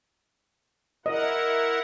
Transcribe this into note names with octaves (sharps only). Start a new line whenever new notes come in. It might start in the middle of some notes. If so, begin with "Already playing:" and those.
E4 A#4 D#5 F#5